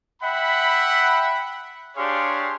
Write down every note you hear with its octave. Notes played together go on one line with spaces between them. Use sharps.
E5 F#5 G5 B5
D4 G4 G#4 C#5 F5 C6